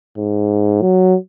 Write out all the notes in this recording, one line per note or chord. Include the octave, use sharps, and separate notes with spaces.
G#2
F#3